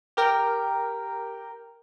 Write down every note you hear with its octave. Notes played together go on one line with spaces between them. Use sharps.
G4 A#4 G5